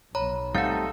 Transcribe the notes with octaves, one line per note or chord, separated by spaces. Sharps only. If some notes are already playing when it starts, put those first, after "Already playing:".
B1 C#5 A#5 B5
G3 A3 C4 D#4 A4 F5 F#5